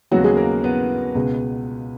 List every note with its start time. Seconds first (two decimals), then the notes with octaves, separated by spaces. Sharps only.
0.11 D#2 C#3 F#3 G#3 B3 F#4
0.24 G#3 G#4
0.37 A#3 A#4
0.64 B3 B4
1.15 C#2 B2 G#3 B3